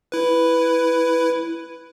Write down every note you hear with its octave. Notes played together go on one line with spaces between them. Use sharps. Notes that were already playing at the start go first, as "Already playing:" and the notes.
E4 B4